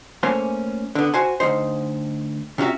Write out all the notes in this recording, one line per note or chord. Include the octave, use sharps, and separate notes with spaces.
A3 A#3 C#4 C5 G#5
D3 B3
F#4 C5 G#5
D2 F#3 D#4 C5
C3 C#4 F4 F#4 E5